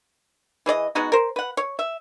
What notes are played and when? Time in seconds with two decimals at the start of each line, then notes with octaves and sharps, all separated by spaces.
0.66 E3 G#4 D5 D#5
0.95 G#3 B3 D#4 F#4
1.12 A#4 C5
1.36 B4 F#5
1.57 C#5
1.79 E5